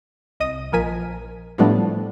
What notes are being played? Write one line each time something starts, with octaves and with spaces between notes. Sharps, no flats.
C2 D#5 D#6 D#7
A#1 F3 A#4 G#5 B6 D#7
A2 F3 G3 A3 B3 D4